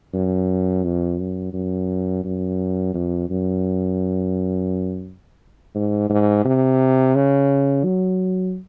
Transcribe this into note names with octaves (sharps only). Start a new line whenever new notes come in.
F#2
F2
F#2
F#2
F#2
F2
F#2
G#2
G#2
C3
C#3
F#3